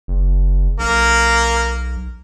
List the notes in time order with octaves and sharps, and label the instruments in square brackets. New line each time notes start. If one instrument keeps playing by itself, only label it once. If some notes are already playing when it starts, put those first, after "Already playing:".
[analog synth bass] F#1
[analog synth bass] B1 [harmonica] A#3 A#4